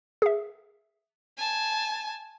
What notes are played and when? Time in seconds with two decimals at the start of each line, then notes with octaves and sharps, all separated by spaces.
0.22 G#4 E5
1.38 G#5 A5